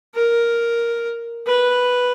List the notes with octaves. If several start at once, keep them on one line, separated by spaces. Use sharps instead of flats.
A#4
B4